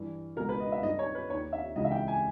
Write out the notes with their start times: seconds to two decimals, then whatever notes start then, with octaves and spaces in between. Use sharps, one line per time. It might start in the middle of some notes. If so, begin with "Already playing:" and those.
Already playing: G2 E3
0.36 B2 A#4
0.39 C#2
0.49 B4
0.60 D#5
0.72 E5
0.83 G2 D#3 D#5
0.99 C#5
1.15 B4
1.30 D#2 D#3 C#5
1.53 E5
1.76 C#2 C#3 E3 D#5
1.85 E5
1.91 G5
2.08 G#5